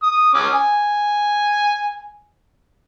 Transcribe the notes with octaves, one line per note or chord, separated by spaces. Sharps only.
D#6
C#4 D6 D#6
G#5